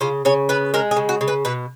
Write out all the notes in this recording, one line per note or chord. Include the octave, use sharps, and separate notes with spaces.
C#3 F4
C#3 C#5
B3 B4
G#3 A#4
G#4
C#3
F#4
C#3
B4
B2 B4